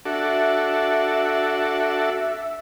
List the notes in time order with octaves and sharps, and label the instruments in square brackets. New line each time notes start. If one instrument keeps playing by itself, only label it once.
[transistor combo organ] D4 F#4 A4 [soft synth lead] E5